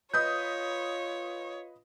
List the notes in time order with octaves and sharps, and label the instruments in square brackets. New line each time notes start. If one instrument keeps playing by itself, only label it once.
[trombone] F4 [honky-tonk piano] B4 D#5 D#6 [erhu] C#5 [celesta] G6